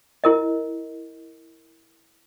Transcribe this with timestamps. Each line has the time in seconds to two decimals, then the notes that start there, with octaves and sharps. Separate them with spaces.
0.24 E4 A#4 D#5